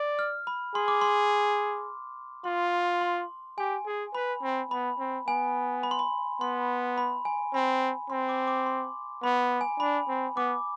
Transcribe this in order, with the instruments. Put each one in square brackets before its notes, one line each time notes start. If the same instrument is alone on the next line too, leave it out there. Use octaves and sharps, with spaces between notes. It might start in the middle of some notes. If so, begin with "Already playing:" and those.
Already playing: [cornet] D5
[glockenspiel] F6
B5
[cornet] G#4 [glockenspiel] C6
[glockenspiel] D6
C6
[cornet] F4 [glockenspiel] C6
[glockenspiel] C6
[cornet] G4 [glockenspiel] G#5
[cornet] G#4
[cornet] B4 [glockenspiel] B5
[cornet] C4
[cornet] B3 [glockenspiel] B5
[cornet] C4
[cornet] B3 [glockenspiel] G#5
[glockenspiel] B5
C6
B5
[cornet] B3 [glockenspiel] C6
[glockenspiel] B5
G#5
[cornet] C4 [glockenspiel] B5
[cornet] C4 [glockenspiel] C6
[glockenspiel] D6
D6
C6
[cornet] B3 [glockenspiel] B5
[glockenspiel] G#5
[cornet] D4 [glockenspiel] B5
[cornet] C4
[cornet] B3 [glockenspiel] D6